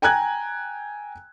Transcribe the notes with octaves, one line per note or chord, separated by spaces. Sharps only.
G5 G#5 A#5 F#6 G#6